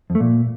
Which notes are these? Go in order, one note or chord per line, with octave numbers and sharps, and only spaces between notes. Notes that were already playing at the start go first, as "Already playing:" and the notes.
F2
A3
A#2